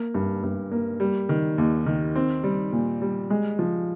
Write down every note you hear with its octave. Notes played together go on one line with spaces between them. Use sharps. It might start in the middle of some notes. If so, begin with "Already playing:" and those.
Already playing: A#3
G2
G2
A#3
G3
D#3
D#2
D#3
C4
G3
A#2
G3
G#3
F3